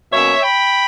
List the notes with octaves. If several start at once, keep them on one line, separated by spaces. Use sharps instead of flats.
B2 F#3 A#3 C#4 C#5 E5
G5 B5